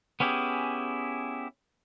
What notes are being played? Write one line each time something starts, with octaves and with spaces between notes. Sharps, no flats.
B3 C#4 E4 G4 G#4